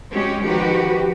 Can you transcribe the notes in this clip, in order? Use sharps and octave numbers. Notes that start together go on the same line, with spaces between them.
G#3 C#4 F#4 G4
D#3 F3 F#4 G4 B4